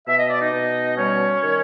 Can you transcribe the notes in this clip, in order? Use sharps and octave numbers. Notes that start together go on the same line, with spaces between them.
B2 E5
D#5
D5
D#4 D#5
B2
G3 C#4 C#5
D#3